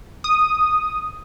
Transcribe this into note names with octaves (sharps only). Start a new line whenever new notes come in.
D#6